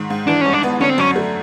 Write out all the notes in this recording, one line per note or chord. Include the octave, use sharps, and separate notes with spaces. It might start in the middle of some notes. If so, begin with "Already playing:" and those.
Already playing: G#2 D#3
G#2
E3 D4
G2 C#4
D4
B3
D3 C#4
C4
F#2 C#4
A3